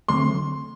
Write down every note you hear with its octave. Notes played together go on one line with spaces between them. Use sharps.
D3 F#3 A3 C4 C6